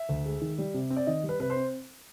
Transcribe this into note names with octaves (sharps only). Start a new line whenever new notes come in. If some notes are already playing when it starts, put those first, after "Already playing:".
Already playing: E5
D2
G#3
D#3
G3
C3
C4
D5
D#3 D#5
G3
B4
C3 B4
C5
C4